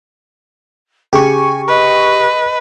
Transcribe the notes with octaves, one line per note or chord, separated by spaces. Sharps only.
C#3 G4 G#5 C#6
B4 D#5